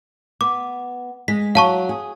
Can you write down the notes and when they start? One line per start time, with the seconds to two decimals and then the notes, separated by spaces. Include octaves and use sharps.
0.41 B3 D6
1.28 G#3 B6
1.55 F#3 F5 A5 C#6
1.89 G#4